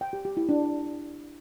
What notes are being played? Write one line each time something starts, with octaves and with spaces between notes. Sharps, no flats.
G5
G4
G4
E4
D4